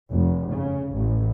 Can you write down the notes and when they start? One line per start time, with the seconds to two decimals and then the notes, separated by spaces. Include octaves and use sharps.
0.12 F1
0.53 C#3
0.93 A1